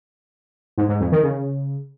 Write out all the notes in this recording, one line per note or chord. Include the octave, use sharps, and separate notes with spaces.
G#2
G#2
F2
D#3
C#3